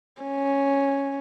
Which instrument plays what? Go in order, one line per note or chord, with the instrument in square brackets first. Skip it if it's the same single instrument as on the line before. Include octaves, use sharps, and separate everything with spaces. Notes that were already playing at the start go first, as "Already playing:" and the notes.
[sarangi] C#4